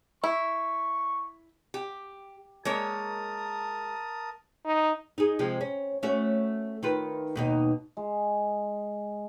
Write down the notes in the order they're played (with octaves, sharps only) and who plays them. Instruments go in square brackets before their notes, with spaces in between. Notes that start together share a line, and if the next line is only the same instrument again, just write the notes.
[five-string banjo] E4 [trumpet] C#6
[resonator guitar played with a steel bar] G4
[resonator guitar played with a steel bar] G#3 A#3 C#5 [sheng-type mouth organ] A#4 A5 D#6
[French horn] D#4
[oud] D#4 G#4
C3 F3 G#3
C#4
A3 C#4 F#4
D#3 F4 B4
D#2 B2 D#4
[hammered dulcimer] G#3